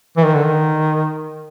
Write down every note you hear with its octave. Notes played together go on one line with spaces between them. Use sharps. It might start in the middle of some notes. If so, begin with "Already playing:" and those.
E3
D#3
D3
D#3